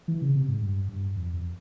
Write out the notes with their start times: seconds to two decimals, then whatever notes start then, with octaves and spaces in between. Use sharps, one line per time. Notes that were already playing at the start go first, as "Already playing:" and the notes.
0.08 E3
0.22 C#3
0.35 C3
0.48 G#2
0.61 G2
0.88 G2
1.16 F2
1.33 F2